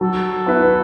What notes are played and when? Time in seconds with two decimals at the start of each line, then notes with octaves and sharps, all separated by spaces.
0.01 F#3 F#4 A4
0.46 B3 E4 B4